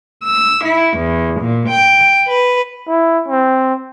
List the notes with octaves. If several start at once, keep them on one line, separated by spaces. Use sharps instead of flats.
E6
E4
E2
A#2
G5
B4
E4
C4